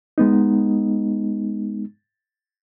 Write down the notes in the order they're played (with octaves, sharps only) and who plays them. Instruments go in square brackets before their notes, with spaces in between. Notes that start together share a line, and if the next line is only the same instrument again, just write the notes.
[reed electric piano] G#3 B3 D#4